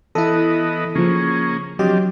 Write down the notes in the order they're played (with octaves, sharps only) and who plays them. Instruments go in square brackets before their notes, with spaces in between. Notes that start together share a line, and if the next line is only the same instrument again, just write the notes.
[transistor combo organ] E3 B3 D#5 [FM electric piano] E4 A4
[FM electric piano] C#3 F3 [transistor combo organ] A#3 C#4 G#4
[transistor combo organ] F3 C4 D4 [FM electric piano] F#3 G4 D#5